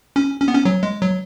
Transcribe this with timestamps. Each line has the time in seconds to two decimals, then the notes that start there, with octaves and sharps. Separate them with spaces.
0.16 C#4
0.40 C#4
0.48 B3
0.55 C#4
0.65 F#3
0.83 G#3
1.02 F#3